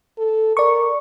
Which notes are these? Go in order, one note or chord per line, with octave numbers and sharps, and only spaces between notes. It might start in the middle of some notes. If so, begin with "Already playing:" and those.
A4
A#4 D5 C#6